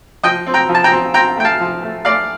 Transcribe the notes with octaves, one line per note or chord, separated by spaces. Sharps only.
F3 D#5 G5
C4
G5 A#5
F3
A5
G5 A#5
C4
C4 G5 A#5
A3 G5
F5 A5
F3
A3
A3 D5 F5